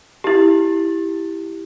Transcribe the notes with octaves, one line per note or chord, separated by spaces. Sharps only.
E4 G4